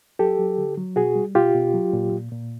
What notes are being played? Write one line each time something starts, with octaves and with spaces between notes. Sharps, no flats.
F#3 G4 A4
F#3
D3
F#3
B2 F#4 G#4
G3
B2 F4 G4
B2
F#3
A#2
A#2
A#2